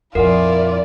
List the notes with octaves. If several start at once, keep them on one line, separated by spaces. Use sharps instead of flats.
F2 A#2 E4 F4 A#4 D5 F#5 G#5